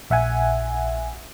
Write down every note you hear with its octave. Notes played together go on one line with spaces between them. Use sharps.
A#1 E5 F#5 G#5